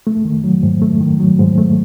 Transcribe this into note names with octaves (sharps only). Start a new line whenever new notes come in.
A3
D#3
F#3
G#2
A3
D#3
F#3
G#2
A3